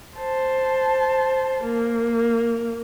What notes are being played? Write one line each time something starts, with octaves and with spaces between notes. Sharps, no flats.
C5 A5
A#3